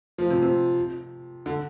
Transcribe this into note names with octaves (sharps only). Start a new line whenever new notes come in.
F3
C3
C3
D3